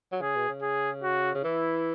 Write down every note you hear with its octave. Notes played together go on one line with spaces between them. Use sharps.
F#3
C#3 G#4
B2
C#3
G#4
F#4
C#3
E3 E4